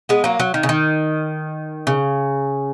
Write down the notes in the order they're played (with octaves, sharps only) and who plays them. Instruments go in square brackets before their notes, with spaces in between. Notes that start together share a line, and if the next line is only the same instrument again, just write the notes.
[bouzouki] G#3 B3
F#3 A#3
F#3
D#3
C#3
D#3
C#3